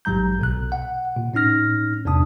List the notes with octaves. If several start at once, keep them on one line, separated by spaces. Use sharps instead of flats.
A1 G#2 F#3 A#5 G6
B1 B2 F#6
F#5
A#2
A2 C#4 D#4 F6 A#6
E2 G2 C3 D4 A5 D#6